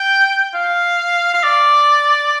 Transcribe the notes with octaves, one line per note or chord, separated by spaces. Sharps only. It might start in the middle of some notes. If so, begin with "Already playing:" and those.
Already playing: G5
F5
F5
D5